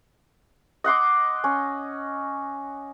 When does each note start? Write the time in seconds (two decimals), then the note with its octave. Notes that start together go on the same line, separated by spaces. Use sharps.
0.84 D#5 F#5 C6 D6
1.44 C#4